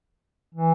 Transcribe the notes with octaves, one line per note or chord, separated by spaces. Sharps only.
E3